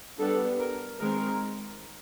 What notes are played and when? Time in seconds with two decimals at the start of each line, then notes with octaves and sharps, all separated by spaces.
0.19 G3 B3 D4 A4
0.59 A#4
0.99 D#3 G#3 C4 A#4